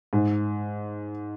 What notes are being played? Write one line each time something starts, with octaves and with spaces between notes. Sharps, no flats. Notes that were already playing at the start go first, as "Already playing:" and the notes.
G#2